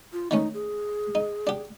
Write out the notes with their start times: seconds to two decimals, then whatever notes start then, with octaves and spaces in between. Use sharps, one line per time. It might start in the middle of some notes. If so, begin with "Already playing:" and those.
0.13 F4
0.31 D#3 A3 C#4 D#4
0.54 G#4
1.15 D#4
1.47 D4 G4